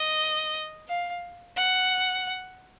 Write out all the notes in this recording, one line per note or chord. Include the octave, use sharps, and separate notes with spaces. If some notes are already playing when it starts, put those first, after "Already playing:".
Already playing: D#5
F5
F#5